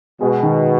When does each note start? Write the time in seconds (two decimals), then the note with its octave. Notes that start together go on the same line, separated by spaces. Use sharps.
0.20 B2 G#3
0.43 D#3